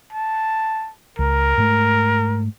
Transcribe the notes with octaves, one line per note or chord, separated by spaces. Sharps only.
A5
C#2 A#4
G#2 A3